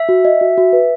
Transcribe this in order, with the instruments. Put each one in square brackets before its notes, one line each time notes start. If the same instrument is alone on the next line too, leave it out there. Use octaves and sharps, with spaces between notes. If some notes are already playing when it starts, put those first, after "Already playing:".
Already playing: [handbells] E5
[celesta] F#4
D#5
F#4
F#4
B4